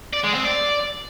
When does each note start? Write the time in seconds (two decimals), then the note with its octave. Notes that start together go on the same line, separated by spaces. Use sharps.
0.13 D5
0.24 G#3
0.35 C4
0.45 D5